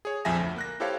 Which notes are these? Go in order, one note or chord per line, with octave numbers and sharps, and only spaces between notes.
G#4 C#5
A#1 F2 F3 E5 G#5 A#6
D2
A#3 F#6 A#6
E4 G4 A4 C5 C#5 F5